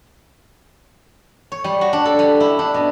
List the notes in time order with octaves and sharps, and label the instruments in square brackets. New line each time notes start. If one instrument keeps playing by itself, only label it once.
[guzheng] C#5
G3
F#4
D4
A4
G3
E4
D4
B2